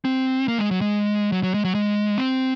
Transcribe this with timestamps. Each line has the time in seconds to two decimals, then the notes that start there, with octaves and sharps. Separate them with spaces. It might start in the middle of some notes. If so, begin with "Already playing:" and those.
0.05 C4
0.48 A#3
0.58 G#3
0.71 F#3
0.81 G#3
1.32 F#3
1.43 F#3
1.54 G#3
1.65 F#3
1.75 G#3
2.18 C4